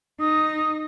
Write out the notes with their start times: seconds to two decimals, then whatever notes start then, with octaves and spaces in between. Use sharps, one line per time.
0.20 D#4 D#6